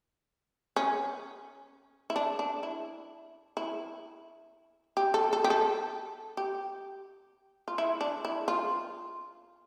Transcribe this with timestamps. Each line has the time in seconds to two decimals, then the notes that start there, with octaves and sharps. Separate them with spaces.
0.76 C#4
2.10 E4
2.16 D4
2.39 D4
2.63 E4
3.57 E4
4.97 G4
5.14 A4
5.33 A4
5.44 G4
5.50 A4
6.37 G4
7.68 F4
7.78 E4
8.01 D4
8.25 E4
8.48 F4